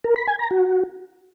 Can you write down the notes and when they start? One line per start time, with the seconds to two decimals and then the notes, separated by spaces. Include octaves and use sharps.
0.04 A#4
0.16 B5
0.27 G#5
0.39 A#5
0.51 F#4